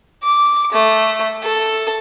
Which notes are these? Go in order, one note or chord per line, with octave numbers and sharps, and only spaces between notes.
D6
A3
A4